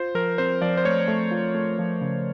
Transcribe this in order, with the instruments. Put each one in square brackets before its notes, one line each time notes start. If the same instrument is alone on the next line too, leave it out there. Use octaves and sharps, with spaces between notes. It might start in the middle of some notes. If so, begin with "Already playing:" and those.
Already playing: [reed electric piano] F4 [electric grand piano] C5
[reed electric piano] F3 [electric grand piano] A#4
[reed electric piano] C4 [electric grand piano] C5
[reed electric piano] F3 [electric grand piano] D5
[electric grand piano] C5
[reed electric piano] A3 [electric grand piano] C#5
[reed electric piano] A3
F4
A3
F3
C#3